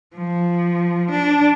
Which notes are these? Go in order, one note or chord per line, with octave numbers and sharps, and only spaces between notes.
F3
D4